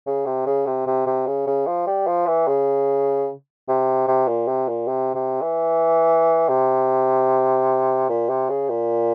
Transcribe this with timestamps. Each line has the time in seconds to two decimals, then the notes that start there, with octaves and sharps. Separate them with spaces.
0.06 C#3
0.26 C3
0.46 C#3
0.66 C3
0.86 C3
1.06 C3
1.27 C#3
1.47 C#3
1.67 F3
1.87 G3
2.07 F3
2.27 E3
2.47 C#3
3.68 C3
4.07 C3
4.28 A#2
4.47 C3
4.68 A#2
4.88 C3
5.15 C3
5.41 E3
6.49 C3
8.09 A#2
8.29 C3
8.49 C#3
8.69 A#2